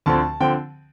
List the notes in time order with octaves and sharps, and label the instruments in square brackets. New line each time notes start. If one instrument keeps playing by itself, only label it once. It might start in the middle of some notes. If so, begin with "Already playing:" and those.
[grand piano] D2 D3 F3 C4 A5
D3 F3 C4 G5